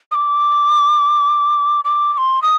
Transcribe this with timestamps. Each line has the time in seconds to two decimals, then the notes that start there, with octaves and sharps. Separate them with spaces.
0.11 D#6
0.15 D6
1.84 D6
2.13 D6
2.18 C6
2.42 D#6